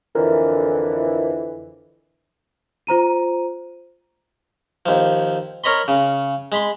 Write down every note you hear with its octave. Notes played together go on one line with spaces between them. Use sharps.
F2 D3 E3 A#4
F4 C5 A#5 D#7
D#2 F3
A#4 C#5 D#5 B5 C6
C#3
G#3 B5 C6